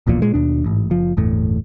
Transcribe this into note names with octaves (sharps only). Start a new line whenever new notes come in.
D1 A#1 E2 A#2
A#2 G#3
D#2 B2 D4
A1 G#2
F#1 F3
G1 E2 A2